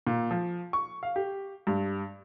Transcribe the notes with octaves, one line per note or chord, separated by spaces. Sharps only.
A#2
F3
C#6
F5
G4
G2